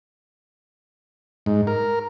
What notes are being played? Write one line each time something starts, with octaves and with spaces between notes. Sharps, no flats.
G#2
A#4